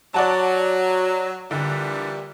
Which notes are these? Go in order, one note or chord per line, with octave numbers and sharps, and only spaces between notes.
F#3 D5 F#5 A5
A#2 D3 E3 G3